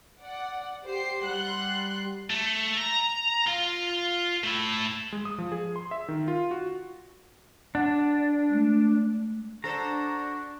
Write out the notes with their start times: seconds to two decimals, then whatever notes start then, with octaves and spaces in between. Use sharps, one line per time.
0.19 D5 F#5
0.87 G4 C5 C7
1.24 G3 F#5 C6 F#6
2.30 A3
2.77 A#5
3.48 F4
4.44 A3 E4
5.12 G#3
5.25 D#6
5.38 F3
5.52 G#4
5.76 C6
5.91 E5
6.08 D#3
6.28 F4
6.51 F#4
7.75 D4 F#5
8.50 G#3 A3
9.64 D4 F#4 A4 C5 A#5